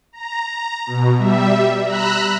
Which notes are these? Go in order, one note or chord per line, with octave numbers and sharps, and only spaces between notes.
A#5
B2
G3 E5
A#5 B5 E6 F#6